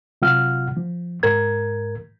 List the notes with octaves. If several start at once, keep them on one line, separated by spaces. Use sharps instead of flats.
C3 F#3 F4 F#5 F6
F3
G#2 A#4 G#6